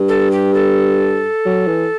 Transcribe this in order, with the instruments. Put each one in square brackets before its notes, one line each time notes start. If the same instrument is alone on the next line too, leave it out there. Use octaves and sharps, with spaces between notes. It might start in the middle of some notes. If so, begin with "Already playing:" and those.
Already playing: [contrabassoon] G2
[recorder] A4
G4
A4
[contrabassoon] F#3
E3